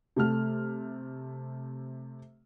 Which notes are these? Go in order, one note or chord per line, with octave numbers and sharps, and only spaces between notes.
C3 A3 F6